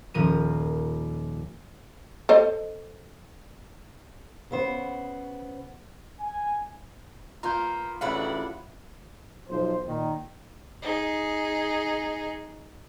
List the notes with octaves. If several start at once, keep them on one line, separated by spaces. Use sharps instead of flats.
D#1 F3 A#4 D#7
A4 C5 D#5
C#3 B3 C5
G#5
A#3 B3 F4 A#5 G6
A1 C#3 D4 E4 F5 F#5 B5
B1 F3 C5
A#2 D#3
D#4 G#4